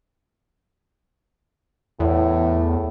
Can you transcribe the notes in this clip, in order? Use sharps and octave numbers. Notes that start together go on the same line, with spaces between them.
E2 A2